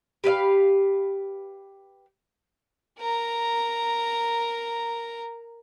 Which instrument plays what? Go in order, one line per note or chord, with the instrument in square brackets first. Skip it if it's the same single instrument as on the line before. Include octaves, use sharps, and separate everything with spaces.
[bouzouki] G4 B4 D#5 F5
[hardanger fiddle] A#4 A#5